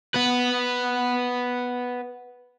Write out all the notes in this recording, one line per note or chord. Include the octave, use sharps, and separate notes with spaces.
B3 B4